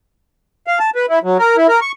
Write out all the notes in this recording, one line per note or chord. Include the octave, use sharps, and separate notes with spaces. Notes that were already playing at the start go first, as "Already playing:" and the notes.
F5
A5
B4
E4
F#3
A#4
E4
A#4
C#6